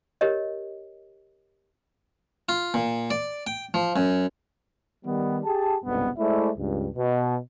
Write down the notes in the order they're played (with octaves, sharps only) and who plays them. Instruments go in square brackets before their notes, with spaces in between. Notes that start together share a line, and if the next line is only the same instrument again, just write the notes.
[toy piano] G4 A#4 C#5 D#5
[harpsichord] F4
A#2
D5
G5
F3
F#2
[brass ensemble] D#3 G3 B3
G4 G#4 A5
F#1 B1 G2 C3 G#3 B3
G#3 A3 E4 C5 D5 E5
C#2 G2
B2